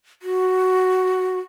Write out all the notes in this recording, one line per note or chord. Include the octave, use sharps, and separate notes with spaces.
F#4